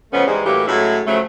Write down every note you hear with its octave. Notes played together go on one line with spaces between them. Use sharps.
C#3 F3 G#3 A3 B3 C#4
G#2 E3 G3 G#3
A2 E3 F#3 A#3 G4
A2 F#3 G#3 C#4 E4
C#3 F3 F#3 A3